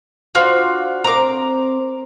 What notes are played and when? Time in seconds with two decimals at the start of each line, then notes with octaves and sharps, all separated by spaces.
0.35 D4 F4 F#4 C5
1.04 C4 A#4 A#5 D6